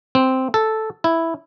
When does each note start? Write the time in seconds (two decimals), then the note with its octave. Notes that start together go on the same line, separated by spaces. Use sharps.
0.15 C4
0.54 A4
1.04 E4